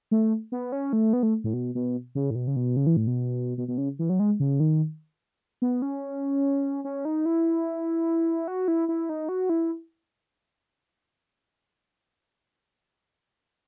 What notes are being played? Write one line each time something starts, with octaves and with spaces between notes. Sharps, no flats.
A3
B3
C#4
A3
B3
A3
A2
B2
B2
C#3
A2
B2
C#3
B2
C#3
E3
A2
B2
B2
B2
C#3
E3
F#3
G#3
C#3
D#3
B3
C#4
C#4
D#4
E4
F#4
E4
E4
D#4
F#4
E4